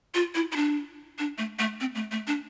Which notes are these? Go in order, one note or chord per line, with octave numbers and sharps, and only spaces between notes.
F4
E4
E4
D4
D4
A3
A3
C4
A3
A3
D4